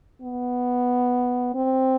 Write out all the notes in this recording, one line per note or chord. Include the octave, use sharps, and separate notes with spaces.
B3
C4